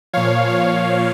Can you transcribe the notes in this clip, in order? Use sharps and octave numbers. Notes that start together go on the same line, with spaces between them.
A#2 F3 C#5 F5
C#5 F5